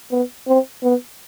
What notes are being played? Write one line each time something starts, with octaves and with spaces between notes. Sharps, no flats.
B3
C4
B3